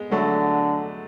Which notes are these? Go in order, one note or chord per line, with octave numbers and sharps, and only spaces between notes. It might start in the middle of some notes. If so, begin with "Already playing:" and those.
Already playing: G#3 B3
D3 F#3 A3